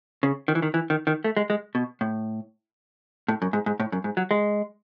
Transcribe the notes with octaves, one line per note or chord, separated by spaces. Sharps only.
C#3
D#3
E3
D#3
E3
D#3
D#3
A3
G#3
G#3
B2
A2
A2
F#2
G#2
G#2
A2
F#2
G#2
F#3
G#3